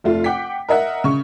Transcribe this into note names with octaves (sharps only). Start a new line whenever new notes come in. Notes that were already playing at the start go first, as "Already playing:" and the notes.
F1 A3 F4
F#5 G5 D6 B6
A#4 D#5 E5 F#5
C#3 C#6